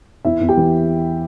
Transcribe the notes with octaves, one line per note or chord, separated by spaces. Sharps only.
E2 E4 E5
E2
G4 G5
E3